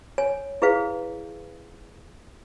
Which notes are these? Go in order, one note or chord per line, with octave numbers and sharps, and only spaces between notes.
C#5 G#5
E4 G#4 B4 F5